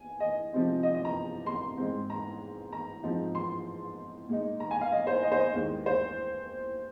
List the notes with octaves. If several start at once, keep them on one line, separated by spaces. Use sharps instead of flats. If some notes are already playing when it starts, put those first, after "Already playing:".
Already playing: G#5
D#5
C3 F3 G#3 C4 D#4
D#5
D#5
A#5
C6
G#2 G#3 C4
A#5
A#5
G#2 F3 C4 D#4
C6
A#2 G#3 D#4
A#5
G#5
F5
D#5
C5
D#5
C5
D#5
D#2 D#3 G#3
C5